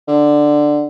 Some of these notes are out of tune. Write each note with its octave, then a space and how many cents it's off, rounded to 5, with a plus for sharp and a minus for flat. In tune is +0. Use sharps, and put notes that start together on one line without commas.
D3 +10